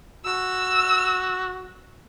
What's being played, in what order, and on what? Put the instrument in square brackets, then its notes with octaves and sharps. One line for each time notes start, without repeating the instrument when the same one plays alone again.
[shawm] F#4 [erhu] E6